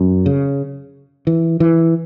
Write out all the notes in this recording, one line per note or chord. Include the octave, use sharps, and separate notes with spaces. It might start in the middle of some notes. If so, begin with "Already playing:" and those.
Already playing: F#2
C#3
E3
E3